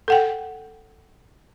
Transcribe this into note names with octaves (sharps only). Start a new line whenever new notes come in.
A4 F#5 G5